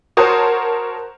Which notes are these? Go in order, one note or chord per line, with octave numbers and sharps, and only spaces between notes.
F#4 A#4 C5 C#5 A5 D#6